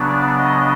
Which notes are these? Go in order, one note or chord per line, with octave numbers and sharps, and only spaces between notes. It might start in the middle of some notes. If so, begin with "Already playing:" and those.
Already playing: C#3 F#3 B3 D4
D5
D#5